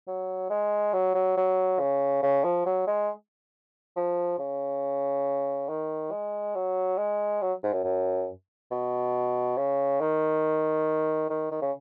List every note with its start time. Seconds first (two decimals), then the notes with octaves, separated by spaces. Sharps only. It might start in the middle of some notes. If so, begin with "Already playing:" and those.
0.07 F#3
0.50 G#3
0.93 F#3
1.14 F#3
1.37 F#3
1.79 C#3
2.23 C#3
2.44 F3
2.66 F#3
2.87 G#3
3.96 F3
4.39 C#3
5.69 D#3
6.11 G#3
6.55 F#3
6.97 G#3
7.42 F#3
7.63 G#2
7.73 F#2
7.84 F#2
8.71 B2
9.57 C#3
10.01 D#3
11.30 D#3
11.51 D#3
11.61 C#3